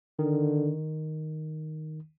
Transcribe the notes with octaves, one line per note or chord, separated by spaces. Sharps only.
D3 D#3